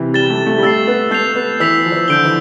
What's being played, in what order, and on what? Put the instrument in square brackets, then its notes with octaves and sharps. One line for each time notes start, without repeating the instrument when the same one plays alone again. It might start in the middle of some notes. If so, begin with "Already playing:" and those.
Already playing: [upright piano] C3 E3
[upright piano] G3 [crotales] A6 E7 G7
[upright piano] A3
A3
G3
[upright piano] A3 [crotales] E6 A6 C7
[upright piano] B3
[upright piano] A3 [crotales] G6 C7 F7
[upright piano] B3
[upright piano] E3 [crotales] E6 B6 F7
[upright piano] F3
E3
[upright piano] D3 [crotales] G6 D7 G7
[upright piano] E3